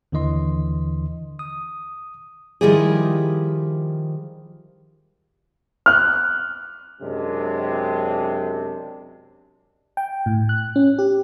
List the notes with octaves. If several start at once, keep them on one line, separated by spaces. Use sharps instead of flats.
D#2 D3 E3 D#5 C6
D#6
D#3 F3 G3 E4 G4 G#4
F6 F#6
F#2 C3 G#3 D4
G5
A2
F#6
C#4
G4